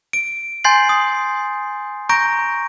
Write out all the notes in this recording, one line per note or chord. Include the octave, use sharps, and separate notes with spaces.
D7
G#5 C6 G6 A6 C7 F#7
D#6
A#5 C#6 G6 A#6 D7